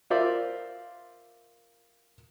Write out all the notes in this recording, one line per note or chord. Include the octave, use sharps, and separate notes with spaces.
F4 A#4 C5 D5 E5